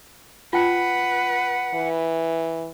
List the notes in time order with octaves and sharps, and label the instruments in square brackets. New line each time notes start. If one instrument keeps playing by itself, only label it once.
[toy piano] F4 G5 A5 [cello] B4 [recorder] F#5
[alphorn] E3